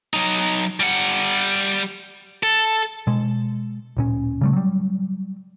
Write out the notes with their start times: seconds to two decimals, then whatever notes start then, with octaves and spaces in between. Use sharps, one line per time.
0.14 F#3 D#4
0.80 G3 F#5
2.43 A4
3.07 B2 G#3
3.97 D1 A#2 C#4
4.41 C#3 G3 A3
4.53 F#3 G3